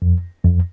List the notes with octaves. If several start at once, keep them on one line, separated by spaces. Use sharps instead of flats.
F2
F2